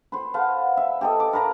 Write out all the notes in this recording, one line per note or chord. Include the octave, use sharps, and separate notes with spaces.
B4 C5
B4 F5 F#5 A5
E5
G4 A4 D#5
D6
A#4 B4 A5 A#5